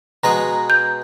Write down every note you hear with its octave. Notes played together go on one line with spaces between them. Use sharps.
B2 G#3 B4 A#5
G6